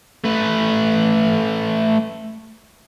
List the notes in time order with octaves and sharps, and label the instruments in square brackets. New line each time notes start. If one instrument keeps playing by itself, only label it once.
[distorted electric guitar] A3 B4